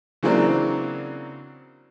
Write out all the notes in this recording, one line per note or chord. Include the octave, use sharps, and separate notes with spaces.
C#3 E3 F#3 A#3 C4 D4